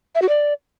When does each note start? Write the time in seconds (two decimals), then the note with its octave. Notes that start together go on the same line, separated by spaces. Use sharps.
0.15 E5
0.22 F#4
0.29 D5